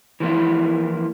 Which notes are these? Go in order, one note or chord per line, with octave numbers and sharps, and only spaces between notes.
E3 F3 A#3 E4